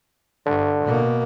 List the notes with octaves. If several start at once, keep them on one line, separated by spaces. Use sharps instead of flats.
G2 D3
B2 A#3